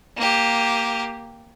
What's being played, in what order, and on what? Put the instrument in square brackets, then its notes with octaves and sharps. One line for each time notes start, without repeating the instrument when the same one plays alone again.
[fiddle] A#3 G4